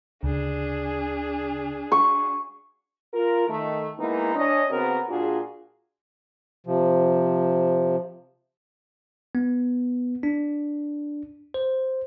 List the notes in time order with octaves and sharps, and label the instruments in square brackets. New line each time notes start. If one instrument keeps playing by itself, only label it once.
[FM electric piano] D2 C#3 [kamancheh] D4 G#4
[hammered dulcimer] C#6
[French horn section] F4 A#4
D#3 A3
E3 G#3 A#3 B3 D#4
C#4 D4 D#5
C#3 B3 C4 F#4 A#4
A#2 D4 F4 F#4 G#4
[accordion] C3 F3
[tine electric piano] B3
D4
C5